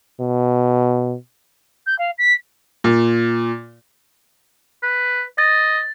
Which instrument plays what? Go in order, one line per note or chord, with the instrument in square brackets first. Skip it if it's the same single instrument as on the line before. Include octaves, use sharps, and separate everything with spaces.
[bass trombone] B2
[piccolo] G6
F5
B6
[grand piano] A#2
[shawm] B4
[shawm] D#5 [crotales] A6